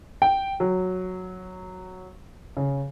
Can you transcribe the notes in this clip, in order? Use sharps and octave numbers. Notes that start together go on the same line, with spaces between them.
G5
F#3
C#3